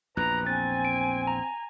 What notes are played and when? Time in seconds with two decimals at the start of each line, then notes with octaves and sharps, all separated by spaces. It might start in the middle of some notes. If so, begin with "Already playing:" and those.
0.17 A#1 E2 B4 A#5 F#6
0.47 C4 G#5 A6
0.85 D7
1.27 A#5